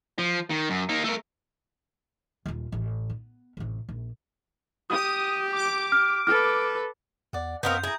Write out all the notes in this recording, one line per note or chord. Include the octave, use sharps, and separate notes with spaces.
F3
D#3
F#2
A#3 D#4
A3 A#4
D#1 F4
A1
B3
A1 C3
A#1
G4 D#6
D6
F6
A4 B4 F6
E2 D5 F#5
F#2 B3 C4 F#4 A#4 D#5 F5 G6
E4 G#4 A#5